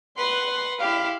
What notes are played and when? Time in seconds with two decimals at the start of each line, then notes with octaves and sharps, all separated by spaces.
0.18 B4 F#5 C6
0.80 E4 G4 F5